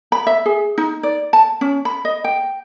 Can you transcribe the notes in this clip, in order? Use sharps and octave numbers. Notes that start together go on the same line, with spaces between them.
B5
E5
G#4
D#4
D5
A5
C#4
B5
D#5
G5